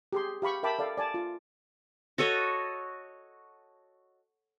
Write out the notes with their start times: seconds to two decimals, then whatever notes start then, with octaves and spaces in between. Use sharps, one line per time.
0.13 G4 G#4 C6
0.42 G4 F5 B5 C#6
0.63 A#4 E5 G5 A5 B5 D6
0.79 A4 D5 F5
0.97 D5 G#5 A5
1.14 F4
2.18 F#4 A4 C#5 D#5